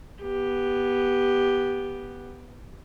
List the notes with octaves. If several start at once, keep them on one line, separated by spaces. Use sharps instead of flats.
B3 G4